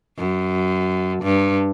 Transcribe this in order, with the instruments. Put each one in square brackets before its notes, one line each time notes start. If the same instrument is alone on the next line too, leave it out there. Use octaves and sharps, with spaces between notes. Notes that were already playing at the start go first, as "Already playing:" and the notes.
[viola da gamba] F#2
G2